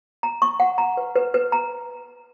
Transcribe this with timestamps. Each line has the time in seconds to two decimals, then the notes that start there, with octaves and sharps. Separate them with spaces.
0.23 A#5
0.42 C#6
0.60 F#5
0.78 A#5
0.97 B4
1.16 B4
1.34 B4
1.52 A#5